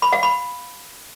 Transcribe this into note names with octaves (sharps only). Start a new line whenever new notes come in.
B5
F5
B5